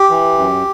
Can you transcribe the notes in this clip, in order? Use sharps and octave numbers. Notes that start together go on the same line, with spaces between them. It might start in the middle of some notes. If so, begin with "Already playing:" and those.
Already playing: G4
E3
F#2